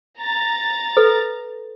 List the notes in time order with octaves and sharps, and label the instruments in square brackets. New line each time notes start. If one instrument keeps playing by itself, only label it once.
[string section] A#5 A6
[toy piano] A4 B4